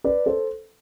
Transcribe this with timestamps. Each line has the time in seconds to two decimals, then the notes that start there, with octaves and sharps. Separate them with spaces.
0.04 B4 D5
0.26 A4 C5